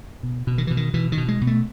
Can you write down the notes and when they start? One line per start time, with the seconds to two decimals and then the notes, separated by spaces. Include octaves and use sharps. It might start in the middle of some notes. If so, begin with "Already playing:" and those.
0.23 B2
0.47 B2
0.58 D#3
0.67 B2 E3
0.77 D#3
0.94 B2 E3
1.12 D#3
1.18 B2
1.28 G#3
1.41 B2
1.47 A3